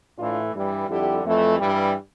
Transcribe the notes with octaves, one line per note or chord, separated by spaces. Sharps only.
A2 E3 A3 D4 F4
G2 E3 G3
F2 D3 G3 E4 G4
F2 E3 A3
G2 E3 G3